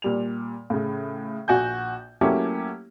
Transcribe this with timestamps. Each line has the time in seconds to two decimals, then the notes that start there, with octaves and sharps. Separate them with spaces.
0.02 A#2 G3 F7
0.70 A2 C#3
1.48 A#1 F#4 G#5 G6
2.21 F#3 A3 A#3 C#4 E4 G4